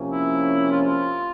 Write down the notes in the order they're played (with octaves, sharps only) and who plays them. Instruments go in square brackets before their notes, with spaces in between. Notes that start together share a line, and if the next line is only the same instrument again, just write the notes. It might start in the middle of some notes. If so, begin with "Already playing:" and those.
Already playing: [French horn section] C3 F3 A#3 C#4
[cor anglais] E4
F4
F4